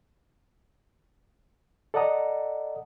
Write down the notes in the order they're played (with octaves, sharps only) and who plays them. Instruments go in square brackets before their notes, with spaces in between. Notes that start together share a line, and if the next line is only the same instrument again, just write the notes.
[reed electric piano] A4 D5 D#5 F#5 A#5 D#6